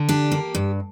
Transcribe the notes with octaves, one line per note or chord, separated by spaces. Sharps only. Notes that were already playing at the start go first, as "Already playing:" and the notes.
Already playing: D3
D4 G4
A#3
G2